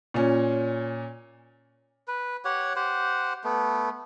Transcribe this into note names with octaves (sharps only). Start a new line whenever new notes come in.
A#2 C#4
B4
G4 C#5 F#5
G4 C5 F#5
A3 B3